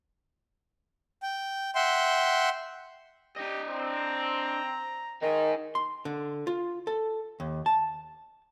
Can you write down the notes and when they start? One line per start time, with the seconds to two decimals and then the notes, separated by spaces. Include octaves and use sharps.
1.23 G5
1.75 E5 F#5 G5 C6
3.36 D4 G4 D#5
3.68 C4 A#5
5.22 D#3 D#4 G#4
5.75 C6
6.05 D3
6.47 F4
6.87 A4
7.40 D#2
7.66 A5